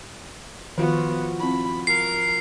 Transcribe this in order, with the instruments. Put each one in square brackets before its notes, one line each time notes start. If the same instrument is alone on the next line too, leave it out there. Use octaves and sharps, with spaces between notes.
[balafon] D#3 [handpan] F3 F4 F#4 [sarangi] B3
[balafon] C4 E4 [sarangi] B5
[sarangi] A#4 [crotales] C7